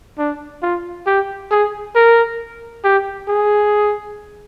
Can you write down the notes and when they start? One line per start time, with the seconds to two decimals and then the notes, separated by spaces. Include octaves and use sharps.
0.18 D4
0.62 F4
1.07 G4
1.51 G#4
1.95 A#4
2.84 G4
3.28 G#4